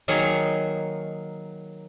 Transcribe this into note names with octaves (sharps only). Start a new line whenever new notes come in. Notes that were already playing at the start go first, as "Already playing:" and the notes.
D#3 F#3 A#3 G#4 C#5 D#5